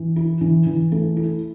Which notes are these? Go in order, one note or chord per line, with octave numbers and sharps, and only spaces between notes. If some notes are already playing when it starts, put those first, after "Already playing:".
Already playing: E3
E4
E3
E3
A3
E4